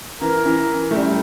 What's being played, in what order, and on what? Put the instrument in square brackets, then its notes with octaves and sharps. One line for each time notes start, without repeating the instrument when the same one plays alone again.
[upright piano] E3 [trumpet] A#4
[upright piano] E3
A3
G3